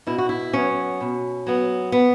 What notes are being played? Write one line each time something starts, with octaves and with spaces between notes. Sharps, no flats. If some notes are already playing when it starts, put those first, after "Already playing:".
B2 E4
F#4
E4
F#3 B3 C#4
B2
F#3 B3
B3